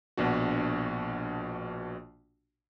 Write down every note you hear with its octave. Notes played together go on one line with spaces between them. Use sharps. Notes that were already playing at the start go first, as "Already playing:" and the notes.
A#1 B2 D4 F#4